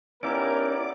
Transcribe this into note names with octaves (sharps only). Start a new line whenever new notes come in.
B3 C#4 D#4 E4 G4 A#4 D5 D6